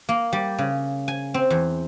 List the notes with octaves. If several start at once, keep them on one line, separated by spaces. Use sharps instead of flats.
A#3
G3
C#3
G#5
C4
E2